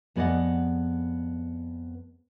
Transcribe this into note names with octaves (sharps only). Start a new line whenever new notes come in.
F2 B3 G#4 D5 D#5 F#5